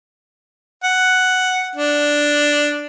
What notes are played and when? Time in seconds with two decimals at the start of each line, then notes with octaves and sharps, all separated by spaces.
0.84 F#5
1.76 D4